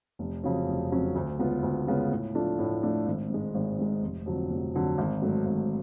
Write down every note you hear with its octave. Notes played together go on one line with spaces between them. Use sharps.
F1
F2 C#3 F#3 C#4
F1
F2 C#3 F#3 C#4
D2
C#3 G#3 B3 F4
D2
C#3 G#3 B3 F4
A2
F3 A3 D4 F4
A2
F3 A3 D4 F4
G#1
G#2 G#3
G#1
G#2 G#3
F1
F2 D3 F#3
F1
F2 D3 F#3
G#1
G#2 F#3 A3
G#1